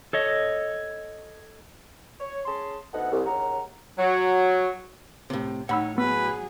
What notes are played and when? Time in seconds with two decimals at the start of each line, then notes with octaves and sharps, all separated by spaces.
0.13 A4 C#5 D#5
2.20 C#5
2.45 C#4 G#4 A5 C6
2.93 D2 B3 D#4 A4 F#5
3.12 C2
3.26 D#2 C#3 F#5 A#5
3.98 F#3
5.30 A2 C3
5.69 A2 D#4 C#5 F#5 B5 E6
5.98 F#3 B3 G#4 B4